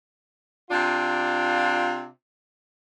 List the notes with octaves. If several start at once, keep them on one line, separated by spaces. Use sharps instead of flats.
C3 D4 F4